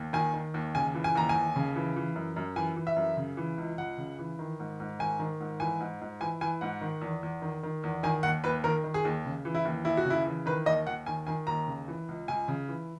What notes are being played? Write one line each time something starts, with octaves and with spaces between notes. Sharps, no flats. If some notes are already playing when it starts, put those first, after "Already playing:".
Already playing: D#2
D#3 G#5
D#3
D#2
C#3 G#5
E3
G#5
D#2 A#5
G#5
D#2
C#3
E3
E3
F#2
F#2
E3 G#5
E3
E5
F#2
C#3
E3
C#2
C#2 F#5
C#3
E3
D#3
G#2
G#2
D#3 G#5
D#3
G#2
E3 G#5
G#2
G#2
E3 G#5
E3 G#5
G#2 F#5
D#3
E2
E2
D#3
D#3
E2
D#3 G#5
D#2 F#5
D#2 B4
D#3 A#4
D#3
G#4
D#2
C#3
E3
E4
D#2
D#2 E4
F#4
C#3 E4
E3
D#3 B4
D#2 D#5
D#2 F#5
D#3 G#5
D#3 G#5
D#2 A#5
C#3
E3
C#2
C#2 G#5
C#3
E3